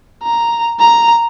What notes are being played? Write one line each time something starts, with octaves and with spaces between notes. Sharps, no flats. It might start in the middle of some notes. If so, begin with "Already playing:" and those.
A#5
A#5